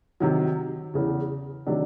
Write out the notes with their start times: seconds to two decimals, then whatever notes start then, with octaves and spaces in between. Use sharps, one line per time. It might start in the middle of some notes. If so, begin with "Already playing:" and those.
0.20 C3 D#3 F#3
0.94 E2 C#3 E3
1.66 C3 D#3 F#3 A3 D4